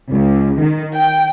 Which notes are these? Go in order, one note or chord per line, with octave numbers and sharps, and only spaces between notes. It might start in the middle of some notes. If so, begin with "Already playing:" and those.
C#2
D#3
G5